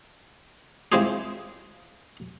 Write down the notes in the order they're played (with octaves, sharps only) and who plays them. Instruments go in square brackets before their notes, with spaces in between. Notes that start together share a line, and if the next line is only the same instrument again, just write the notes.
[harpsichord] G#3 C4 E4 F4 G4 G#4